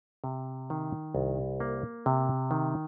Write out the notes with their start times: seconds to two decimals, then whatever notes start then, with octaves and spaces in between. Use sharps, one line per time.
0.24 C3
0.70 D#3
1.15 C2
1.60 A#3
2.06 C3
2.51 D#3